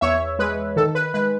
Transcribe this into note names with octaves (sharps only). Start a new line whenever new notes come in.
E2 C#5 E5
G#3 B4
D#3 A4
B4
G#3 B4